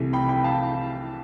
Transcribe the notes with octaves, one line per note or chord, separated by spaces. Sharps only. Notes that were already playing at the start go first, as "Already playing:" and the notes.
Already playing: C2 C3 E3 A3
G5 B5
G5 B5
F5 A5